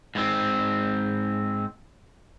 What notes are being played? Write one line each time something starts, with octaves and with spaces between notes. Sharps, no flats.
G#2 C4